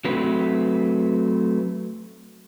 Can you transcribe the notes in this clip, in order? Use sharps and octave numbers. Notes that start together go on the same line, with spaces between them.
F#3 A3 C4 B4